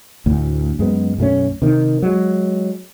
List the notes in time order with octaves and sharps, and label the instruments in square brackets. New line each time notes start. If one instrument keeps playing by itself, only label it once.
[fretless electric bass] D2 A2
F#2 G#3 B3
B1 F#2 A3 C#4
C3 D#3
F#3 G#3